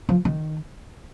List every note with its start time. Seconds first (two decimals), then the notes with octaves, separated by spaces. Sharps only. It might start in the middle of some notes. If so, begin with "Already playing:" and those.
0.09 F3
0.25 D#3